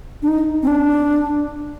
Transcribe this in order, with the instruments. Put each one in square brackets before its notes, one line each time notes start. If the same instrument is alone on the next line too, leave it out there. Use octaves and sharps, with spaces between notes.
[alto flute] D4
D#4
C4
D4